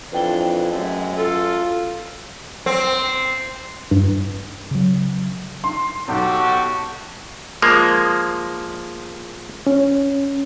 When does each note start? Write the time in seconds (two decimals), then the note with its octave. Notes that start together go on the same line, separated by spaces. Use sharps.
0.13 F2 E3 D4 B4 G5 G7
0.72 F#2 G#3 A3
1.17 F4 A4
2.66 C4
3.91 G2
4.71 C#3 F#3
5.64 C6
6.08 B1 F#4 G4 A4
7.62 F3 G#3 A#3
9.67 C#4